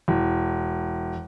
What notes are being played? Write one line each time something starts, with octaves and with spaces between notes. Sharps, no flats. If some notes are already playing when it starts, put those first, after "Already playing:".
E1